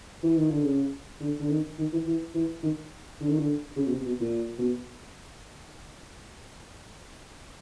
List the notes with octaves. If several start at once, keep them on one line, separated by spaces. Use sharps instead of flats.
E3
D#3
D3
C#3
D3
D3
D#3
D#3
E3
E3
E3
D#3
D3
D#3
D3
C#3
B2
C3
B2
A#2
B2